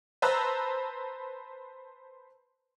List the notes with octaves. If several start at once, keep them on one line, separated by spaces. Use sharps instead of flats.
B4 C5 A5 A#5 E6 F#6